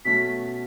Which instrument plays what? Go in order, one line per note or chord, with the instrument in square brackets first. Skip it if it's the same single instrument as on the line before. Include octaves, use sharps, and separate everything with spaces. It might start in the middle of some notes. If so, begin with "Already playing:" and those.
[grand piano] B2 F#3 A3 C#4 [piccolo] B6